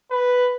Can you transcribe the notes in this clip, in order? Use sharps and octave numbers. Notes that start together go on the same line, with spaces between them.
B4